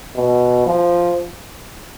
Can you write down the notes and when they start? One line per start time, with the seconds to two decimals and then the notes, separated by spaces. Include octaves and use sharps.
0.16 B2
0.66 F3